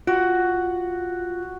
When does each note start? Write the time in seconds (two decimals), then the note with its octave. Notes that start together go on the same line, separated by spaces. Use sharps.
0.07 F4 F#4